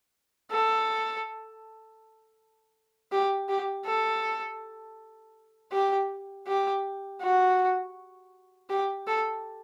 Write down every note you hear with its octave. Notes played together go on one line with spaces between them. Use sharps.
A4
G4
G4
A4
G4
G4
F#4
G4
A4